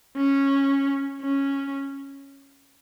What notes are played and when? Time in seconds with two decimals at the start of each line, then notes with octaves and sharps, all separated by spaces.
0.17 C#4
1.22 C#4